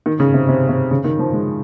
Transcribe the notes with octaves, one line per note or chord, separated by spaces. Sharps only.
D#3
C#3
C3
C3
C3
C#3
D#3
F3
G#3